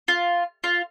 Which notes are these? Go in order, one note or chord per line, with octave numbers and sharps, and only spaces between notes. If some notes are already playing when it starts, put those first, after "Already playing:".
F4
F4